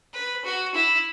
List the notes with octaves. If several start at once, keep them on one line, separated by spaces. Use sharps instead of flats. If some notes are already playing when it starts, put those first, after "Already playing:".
B4
F#4
E4